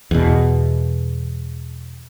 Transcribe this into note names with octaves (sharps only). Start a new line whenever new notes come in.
E2 B2